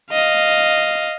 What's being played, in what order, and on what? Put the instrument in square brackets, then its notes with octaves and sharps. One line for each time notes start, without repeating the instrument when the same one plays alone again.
[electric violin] D#5 F5